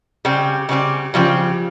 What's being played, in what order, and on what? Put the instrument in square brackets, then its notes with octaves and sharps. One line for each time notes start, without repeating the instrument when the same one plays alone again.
[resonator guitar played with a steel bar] C#3 G3 C4 G4
C#3 G3 C4 G4
[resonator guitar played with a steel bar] C#3 G3 C4 G4 [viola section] F3 F4